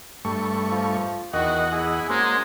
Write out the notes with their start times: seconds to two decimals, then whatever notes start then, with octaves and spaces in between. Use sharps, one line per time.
0.25 G2 A3 C#6
0.72 F3
1.33 E2 D#3 F#4 D#5 F#5
1.72 E4 G#4
2.09 G#3 A#3 C#4 F#4 C5